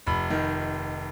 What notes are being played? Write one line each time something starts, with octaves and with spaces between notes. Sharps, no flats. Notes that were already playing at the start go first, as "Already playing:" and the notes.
F1 B5
D#3